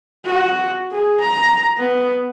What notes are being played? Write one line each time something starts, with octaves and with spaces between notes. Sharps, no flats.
F#4
G#4
A#5
B3